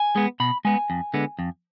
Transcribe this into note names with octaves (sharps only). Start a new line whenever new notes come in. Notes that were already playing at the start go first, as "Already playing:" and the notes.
Already playing: G#5
G#3 B3
B2 B5
G#3 B3 G#5
F2
D3 G#3 B3
F2